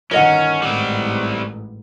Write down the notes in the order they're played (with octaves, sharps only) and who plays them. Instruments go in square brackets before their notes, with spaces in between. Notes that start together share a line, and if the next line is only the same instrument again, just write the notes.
[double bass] G1 D#3 [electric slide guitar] C#4 [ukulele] A#4 D#5 F#5
[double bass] A1 G#2 [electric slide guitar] G3 C4